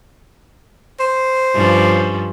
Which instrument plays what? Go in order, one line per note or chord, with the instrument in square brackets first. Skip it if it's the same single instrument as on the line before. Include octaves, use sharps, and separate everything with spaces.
[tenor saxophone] C5
[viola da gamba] G2 F3 C#4